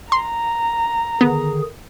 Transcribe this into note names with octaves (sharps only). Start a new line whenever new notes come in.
A#5 C6
D3 D#3 B3 G#4